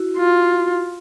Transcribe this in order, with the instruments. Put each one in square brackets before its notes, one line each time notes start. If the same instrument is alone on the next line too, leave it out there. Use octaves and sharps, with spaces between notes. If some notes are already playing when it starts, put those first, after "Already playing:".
Already playing: [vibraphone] E4 F#4
[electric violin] F4